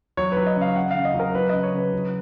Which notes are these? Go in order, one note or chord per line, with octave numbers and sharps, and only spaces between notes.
F#3 C#5
B4
F#3
D#5
C#3
F5
C#3 F#5
C#3 F5
D#5
F#3
A#4
F#3 B4
C#3 D#5
C#5
C#3 B4
F#3